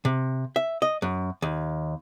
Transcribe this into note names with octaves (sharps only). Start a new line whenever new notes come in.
C3
E5
D#5
F#2
D#2